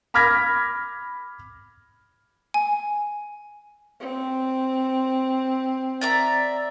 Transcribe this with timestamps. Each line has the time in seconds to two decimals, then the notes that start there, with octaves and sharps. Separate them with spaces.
0.14 B5 D6 F6 G#6 A#6 B6
2.54 G#5
4.00 C4
6.01 D5 E5 A#5